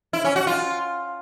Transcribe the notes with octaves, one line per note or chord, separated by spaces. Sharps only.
E4
C#4
F#4
F4